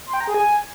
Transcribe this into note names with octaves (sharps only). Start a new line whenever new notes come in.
C6
G5
A#5
G#4
G#5